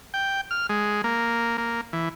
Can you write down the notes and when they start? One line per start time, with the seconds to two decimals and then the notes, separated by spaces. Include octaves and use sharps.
0.14 G5
0.51 F6
0.69 G#3
1.04 A#3
1.58 A#3
1.93 E3